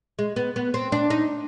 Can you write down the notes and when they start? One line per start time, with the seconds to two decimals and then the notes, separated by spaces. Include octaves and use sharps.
0.19 G#3
0.36 B3
0.56 B3
0.74 C4
0.92 D4
1.10 D#4